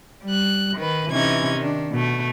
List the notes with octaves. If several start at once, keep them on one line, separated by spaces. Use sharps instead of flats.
G3 F#6
D#3 B4
C3 E3 C#4 D#4 G#6
D#3 D4
B2 A3